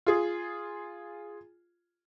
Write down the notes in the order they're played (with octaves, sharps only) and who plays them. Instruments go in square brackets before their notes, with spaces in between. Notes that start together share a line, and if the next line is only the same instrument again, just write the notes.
[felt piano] F4 G#4